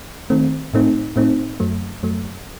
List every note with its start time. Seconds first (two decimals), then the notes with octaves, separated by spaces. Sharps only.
0.30 D#3 A3 C4
0.74 A2 A3 C4 D#4
1.16 A2 A3 C4 D#4
1.60 F#2 F#3 A3
2.03 F#2 F#3 A3